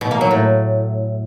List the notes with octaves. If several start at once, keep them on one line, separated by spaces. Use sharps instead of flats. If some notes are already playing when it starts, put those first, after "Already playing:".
B2
A#3
F#3
A2